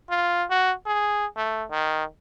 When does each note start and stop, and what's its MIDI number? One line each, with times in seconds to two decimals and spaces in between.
0.10 0.44 65
0.50 0.72 66
0.87 1.26 68
1.37 1.64 57
1.71 2.04 51